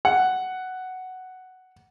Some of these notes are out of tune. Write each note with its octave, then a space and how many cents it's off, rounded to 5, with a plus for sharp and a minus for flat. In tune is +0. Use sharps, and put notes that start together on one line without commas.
F#5 +5